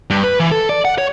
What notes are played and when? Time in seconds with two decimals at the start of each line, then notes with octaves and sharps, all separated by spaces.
0.10 G2
0.24 B4
0.40 E3
0.51 A4
0.69 D5
0.85 F#5
0.98 C#5